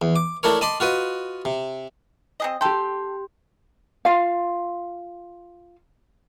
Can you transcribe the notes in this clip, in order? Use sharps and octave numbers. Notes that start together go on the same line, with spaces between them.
E2
D6
A3 D4 E4 A#4 C#5
D#5 A5 B5 C6 D6
F4 F#4 B4 D#5
C3
C4 G#4 D#5
G4 A4 G5 C6
F4 F5